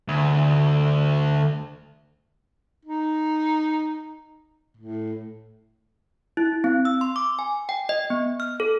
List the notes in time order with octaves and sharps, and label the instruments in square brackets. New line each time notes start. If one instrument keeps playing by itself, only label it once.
[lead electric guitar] D2
[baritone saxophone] D#4
A2
[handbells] E4
C4
E6
C6
D6
G#5
G5
D#5
B3
F6
A4